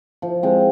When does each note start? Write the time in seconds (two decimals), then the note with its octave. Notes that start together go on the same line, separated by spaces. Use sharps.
0.22 F3
0.43 G#3 C4